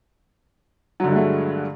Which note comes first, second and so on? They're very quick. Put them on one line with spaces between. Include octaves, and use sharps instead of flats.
F#3 D3 G2 G#3 A3